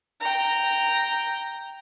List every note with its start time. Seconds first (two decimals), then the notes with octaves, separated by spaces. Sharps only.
0.20 G5 A#5